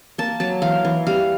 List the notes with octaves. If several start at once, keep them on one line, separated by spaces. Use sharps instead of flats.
A#3 A5
F#3 A5
E3 F5
E3
G3 F5